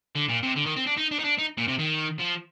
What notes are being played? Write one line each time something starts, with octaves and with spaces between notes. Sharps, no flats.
D3
A#2
C3
D3
D#3
C4
D4
D#4
D4
D#4
D4
D#4
A#2
C3
D#3
F3